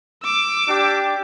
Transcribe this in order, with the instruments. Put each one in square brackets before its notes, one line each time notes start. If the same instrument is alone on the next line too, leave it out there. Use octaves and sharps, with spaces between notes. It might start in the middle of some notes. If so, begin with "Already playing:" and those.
[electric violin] D6 E6
[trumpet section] D4 G4